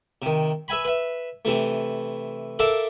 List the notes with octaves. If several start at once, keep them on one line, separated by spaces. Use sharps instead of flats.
C3 D#3
B4 E5 G#5 B5
B4 E5
C3 E3 A3
A4 A#4 D5 E5 F5 A5